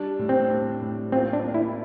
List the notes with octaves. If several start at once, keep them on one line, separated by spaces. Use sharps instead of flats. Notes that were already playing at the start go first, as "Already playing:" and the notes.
Already playing: G3 D4
A2
C4
D4
A2
C4 F4
D4
A#3
E4